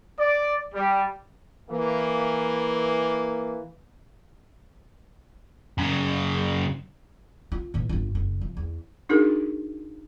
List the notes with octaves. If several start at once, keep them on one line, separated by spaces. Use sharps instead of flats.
D5
G3
E3 A#3
F#2 C#3
F4
A#2 E3
G1 F4
F#1
F3
E2
D4 D#4 F#4 G#4 A#4